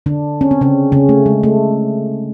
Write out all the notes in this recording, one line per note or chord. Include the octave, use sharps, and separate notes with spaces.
D3 D4
C#4
C4
C#3 C#4
C#3 C#4
A3
G#3
A3